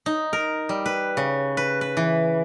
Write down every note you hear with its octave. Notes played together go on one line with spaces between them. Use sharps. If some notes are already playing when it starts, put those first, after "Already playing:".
D#4
A#4
G3
B4
C#3
B4
B4
E3